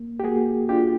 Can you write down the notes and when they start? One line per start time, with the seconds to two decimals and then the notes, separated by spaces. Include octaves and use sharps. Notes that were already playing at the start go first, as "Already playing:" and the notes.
Already playing: A#3
0.20 G4
0.24 A#3 F#4 G#4
0.69 D4 F4 G4